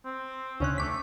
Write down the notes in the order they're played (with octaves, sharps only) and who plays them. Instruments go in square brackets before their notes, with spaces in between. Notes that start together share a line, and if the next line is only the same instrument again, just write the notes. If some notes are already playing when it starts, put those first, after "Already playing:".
[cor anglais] C4
[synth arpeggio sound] D2 C#3 F#6 [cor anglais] C#4
[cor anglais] A3 [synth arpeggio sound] D6 B6